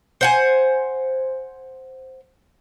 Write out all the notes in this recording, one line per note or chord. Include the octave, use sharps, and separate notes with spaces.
C5 F#5 G#5